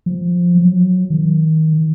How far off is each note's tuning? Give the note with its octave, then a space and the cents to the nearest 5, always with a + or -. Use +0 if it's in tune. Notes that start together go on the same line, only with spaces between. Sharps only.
F3 +5
F#3 -20
D#3 +25